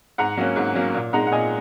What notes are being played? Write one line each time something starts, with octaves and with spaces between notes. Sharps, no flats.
G#2 F#5 A#5
F#3 A#3 C#4
G#2
F#3 A#3 C#4
A#2
G#3 D#4 F#5 A#5
F#5
A#2 D#5 G#5